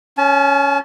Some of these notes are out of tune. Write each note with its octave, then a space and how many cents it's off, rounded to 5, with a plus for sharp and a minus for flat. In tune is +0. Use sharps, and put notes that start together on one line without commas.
C#4 +5 A5 -40